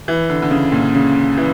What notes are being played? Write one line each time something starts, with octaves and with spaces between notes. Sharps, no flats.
E3
D3
D3
C#3
A#2
C#3
E3